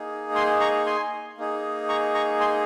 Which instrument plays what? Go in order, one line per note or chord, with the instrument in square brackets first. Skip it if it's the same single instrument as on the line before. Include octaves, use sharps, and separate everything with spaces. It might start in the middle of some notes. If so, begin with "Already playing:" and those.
Already playing: [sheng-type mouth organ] A#3 D#4 G#4
G#5 C6
A#5 C#6
G#5 C6
A#3 D#4 G#4
A#5 C#6
A#5 C#6
G#5 C6